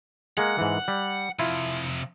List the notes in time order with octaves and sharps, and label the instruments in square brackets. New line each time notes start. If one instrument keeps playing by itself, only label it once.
[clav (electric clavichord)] G#3 A#3 [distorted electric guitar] F#5
[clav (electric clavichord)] G#2 E3
G3
[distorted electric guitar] C3 F3 [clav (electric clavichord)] E4 F4